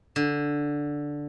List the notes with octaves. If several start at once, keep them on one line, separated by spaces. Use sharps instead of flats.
D3